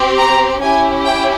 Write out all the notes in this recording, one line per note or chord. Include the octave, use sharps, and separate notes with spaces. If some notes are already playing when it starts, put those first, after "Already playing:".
Already playing: C4 G4
A#5
C#4 E4 G4 G#5
G5